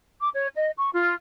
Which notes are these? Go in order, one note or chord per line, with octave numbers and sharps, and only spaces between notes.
D6
C#5
D#5
C#6
F4